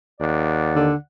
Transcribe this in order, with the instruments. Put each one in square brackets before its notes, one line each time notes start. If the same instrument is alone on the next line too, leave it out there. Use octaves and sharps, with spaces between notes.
[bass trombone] D#2 [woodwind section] D5 F#5
[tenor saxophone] D3